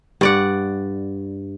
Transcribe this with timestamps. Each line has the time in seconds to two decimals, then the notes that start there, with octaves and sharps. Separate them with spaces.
0.21 G2 D5 F#5